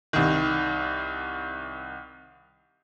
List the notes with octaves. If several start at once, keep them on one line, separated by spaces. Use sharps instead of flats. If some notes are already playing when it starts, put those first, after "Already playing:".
C2 D#3